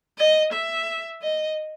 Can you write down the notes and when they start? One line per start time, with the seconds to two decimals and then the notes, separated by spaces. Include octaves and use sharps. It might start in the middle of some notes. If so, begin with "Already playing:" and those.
0.18 D#5
0.52 E5
1.22 D#5